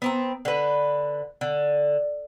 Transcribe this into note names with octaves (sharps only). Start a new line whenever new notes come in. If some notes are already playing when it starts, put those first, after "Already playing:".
B3 C4 A#5
D3 B4
D3